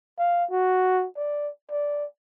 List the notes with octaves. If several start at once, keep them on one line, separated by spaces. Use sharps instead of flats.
F5
F#4
D5
D5